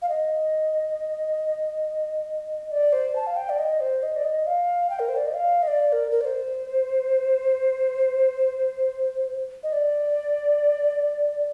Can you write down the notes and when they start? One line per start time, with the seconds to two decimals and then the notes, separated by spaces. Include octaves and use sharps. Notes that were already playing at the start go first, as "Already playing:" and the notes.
0.02 F5
0.09 D#5
2.71 D5
2.92 C5
3.16 A5
3.27 F5
3.36 G5
3.49 D5
3.59 D#5
3.80 C5
4.03 D#5
4.16 D5
4.24 D#5
4.47 F5
4.90 G5
4.99 A#4
5.09 C5
5.16 D5
5.26 D#5
5.34 F5
5.63 D#5
5.67 D5
5.92 A#4
6.11 A#4
6.21 D5
6.25 C5
9.63 D#5
9.72 D5